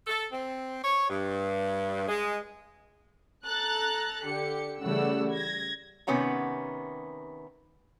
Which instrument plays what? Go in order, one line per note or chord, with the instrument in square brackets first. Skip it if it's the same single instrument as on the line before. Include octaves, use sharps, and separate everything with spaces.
[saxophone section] A4
C4
C#5
G2
G#3
[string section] A4 A#5 F#6 A6
D3 G4 C#7
C#3 E3 G3 A3 F#5 E6
G#6 A#6
[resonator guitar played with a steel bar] C3 D#3 B3 C#4 F#5 A#5